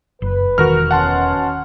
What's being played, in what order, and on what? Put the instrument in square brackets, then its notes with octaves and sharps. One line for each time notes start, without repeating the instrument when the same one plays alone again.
[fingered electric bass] F#1 [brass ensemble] B4
[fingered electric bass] E1 D#3 [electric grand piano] F#4 A#4 F6
[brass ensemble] B2 C#4 [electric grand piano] F#5 A5 C6